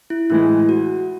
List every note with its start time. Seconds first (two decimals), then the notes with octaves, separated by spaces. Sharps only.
0.10 E4
0.30 A2 E3 G#3 E4
0.69 F#4